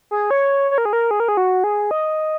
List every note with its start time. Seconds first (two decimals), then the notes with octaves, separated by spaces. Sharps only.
0.11 G#4
0.31 C#5
0.71 C#5
0.78 A#4
0.85 G#4
0.93 A#4
1.11 G#4
1.20 A#4
1.28 G#4
1.37 F#4
1.64 G#4
1.91 D#5